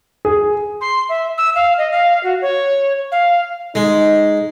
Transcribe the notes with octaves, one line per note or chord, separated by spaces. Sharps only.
G#4
C6
E5
E6
F5
D#5
F5
F#4
C#5
F5
G#3 D#4